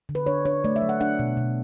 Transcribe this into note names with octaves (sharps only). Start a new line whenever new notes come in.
D3
B4
D4 C#5
D4 C#5
A3 D5
E5
F#3
F#5
D4 F#5
B2
B2